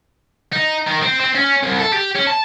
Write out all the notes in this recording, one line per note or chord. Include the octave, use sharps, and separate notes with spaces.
D#4
D#3
C4
C4
C#4
C2
A4
G4
C#4
A5